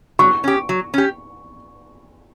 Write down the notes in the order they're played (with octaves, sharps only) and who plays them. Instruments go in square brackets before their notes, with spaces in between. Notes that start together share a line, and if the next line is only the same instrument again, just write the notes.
[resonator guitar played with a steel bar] F#3 [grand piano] C#6
[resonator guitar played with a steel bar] C#4 G4
F#3
C#4 G4